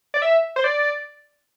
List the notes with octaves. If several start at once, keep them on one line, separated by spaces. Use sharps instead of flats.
D5
E5
C5
D5